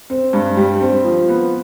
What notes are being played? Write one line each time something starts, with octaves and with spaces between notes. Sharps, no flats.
C4
G2
G3
C4
F3
B3